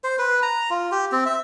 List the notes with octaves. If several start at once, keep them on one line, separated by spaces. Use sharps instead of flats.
C5
B4
A#5
F4
G4
C4
E5